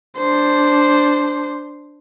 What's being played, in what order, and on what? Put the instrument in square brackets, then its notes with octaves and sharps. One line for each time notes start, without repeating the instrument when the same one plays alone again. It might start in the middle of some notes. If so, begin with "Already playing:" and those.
[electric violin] D4 C5